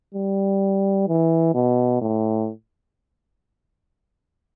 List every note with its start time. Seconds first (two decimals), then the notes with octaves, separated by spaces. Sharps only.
0.15 G3
1.08 E3
1.54 B2
2.01 A2